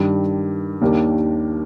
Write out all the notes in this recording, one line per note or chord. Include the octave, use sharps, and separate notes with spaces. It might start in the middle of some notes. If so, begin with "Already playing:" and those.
Already playing: G2 D#3 G3 D4 G4
D#2 D#3 A#3 D4 G4